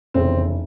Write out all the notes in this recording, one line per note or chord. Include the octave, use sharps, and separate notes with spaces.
F1 E2 C#3 C4